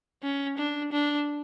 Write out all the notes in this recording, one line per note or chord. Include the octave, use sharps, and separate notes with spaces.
C#4
D4
D4